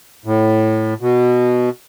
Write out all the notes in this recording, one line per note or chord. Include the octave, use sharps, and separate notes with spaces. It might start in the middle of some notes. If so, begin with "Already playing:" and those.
A2
B2